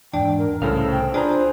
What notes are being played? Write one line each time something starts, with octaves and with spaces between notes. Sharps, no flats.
E2 G#2 D4 G5
A#4
C2 A2 C#3 E4 A4 C5 F5
G5
D4 F4 G#4 B4 C5 A#5